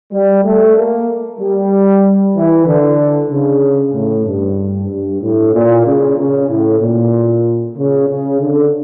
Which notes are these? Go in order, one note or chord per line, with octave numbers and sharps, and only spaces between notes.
G3
A3
A#3
G3
E3
D3
C#3
A2
G2
G2
A2
A#2
C#3
C#3
A2
A#2
C#3
C#3
D3